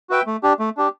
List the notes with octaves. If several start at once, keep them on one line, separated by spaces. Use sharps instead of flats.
F#4 B4 E5 G5
A3
D4 G4
A3
D4 G4